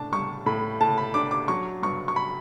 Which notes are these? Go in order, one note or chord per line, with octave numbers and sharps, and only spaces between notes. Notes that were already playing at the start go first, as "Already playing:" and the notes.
Already playing: A2 D4 A5
G3 C#6
A2 B5
A2 A5
B5
D4 D6
D6
F#3 C#6
G2 C#6
C#6
B5